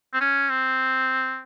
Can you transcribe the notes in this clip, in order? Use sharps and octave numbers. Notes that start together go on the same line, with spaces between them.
C4
C#4
C4